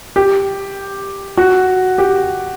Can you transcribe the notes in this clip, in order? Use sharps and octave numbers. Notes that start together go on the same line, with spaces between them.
G4
F#4
G4